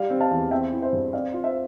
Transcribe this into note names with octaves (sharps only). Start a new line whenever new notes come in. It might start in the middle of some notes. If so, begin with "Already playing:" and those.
Already playing: G3 D5 F5
C4
F5 A5
E2
C4 E5 G5
E4
C5 E5
G2
C4 D5 F5
F4
C5 E5